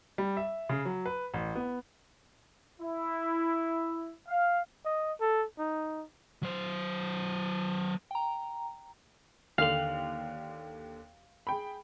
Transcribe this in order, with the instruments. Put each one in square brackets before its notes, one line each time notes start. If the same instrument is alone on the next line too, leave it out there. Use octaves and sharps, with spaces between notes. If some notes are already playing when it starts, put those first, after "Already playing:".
[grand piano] G3
E5
C#3
F#3
B4
A1
B3
[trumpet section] E4
F5
[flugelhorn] D#5
A4
D#4
[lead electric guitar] F#3 C5
[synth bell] G5 A#5
[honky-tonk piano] D#2 D3 F#7 [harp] F5
[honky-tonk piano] G#4 G5 B5